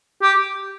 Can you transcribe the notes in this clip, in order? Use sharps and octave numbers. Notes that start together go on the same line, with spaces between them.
G4